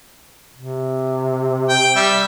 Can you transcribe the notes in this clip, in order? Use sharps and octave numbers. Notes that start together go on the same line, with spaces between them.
C3
G5
G3 E5